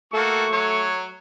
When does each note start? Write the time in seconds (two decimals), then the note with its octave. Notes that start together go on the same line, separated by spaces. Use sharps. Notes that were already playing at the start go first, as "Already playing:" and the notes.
0.14 A3 A#3 F#4 A4 C#6
0.52 F#3 C#5